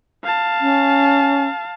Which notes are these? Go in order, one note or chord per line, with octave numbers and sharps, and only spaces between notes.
F5 A5
C#4